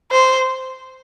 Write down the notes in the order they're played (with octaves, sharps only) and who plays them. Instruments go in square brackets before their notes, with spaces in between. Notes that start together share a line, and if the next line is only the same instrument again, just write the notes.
[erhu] C5